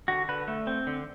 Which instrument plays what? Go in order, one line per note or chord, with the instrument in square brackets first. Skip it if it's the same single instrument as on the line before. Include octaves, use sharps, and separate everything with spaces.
[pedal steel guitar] D3 F#4
D3 B4
A3
C4
D3